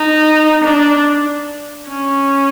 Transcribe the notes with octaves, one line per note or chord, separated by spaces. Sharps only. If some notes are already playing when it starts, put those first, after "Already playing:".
Already playing: D#4
D4
C#4